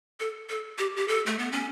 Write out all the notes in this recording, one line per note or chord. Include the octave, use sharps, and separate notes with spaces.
A4
A4
G4
G4
A4
A3
B3
C#4